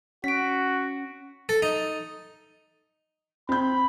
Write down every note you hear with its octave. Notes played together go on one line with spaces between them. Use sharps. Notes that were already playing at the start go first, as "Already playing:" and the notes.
C#4 F#4 B6 D7
A4
D#4
C4 B5 G6